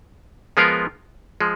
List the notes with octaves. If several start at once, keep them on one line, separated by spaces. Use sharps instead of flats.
F3 G#3 B3 F4 A#4
F3 G#3